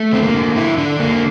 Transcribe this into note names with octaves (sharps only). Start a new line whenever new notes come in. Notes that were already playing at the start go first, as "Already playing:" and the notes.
Already playing: A3
D3 C4
A#3
D3
D3 E4
D3 D4
D3 A#3